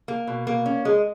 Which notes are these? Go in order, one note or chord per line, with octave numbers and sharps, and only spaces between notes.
A#3
B2
A#3
C#4
G#3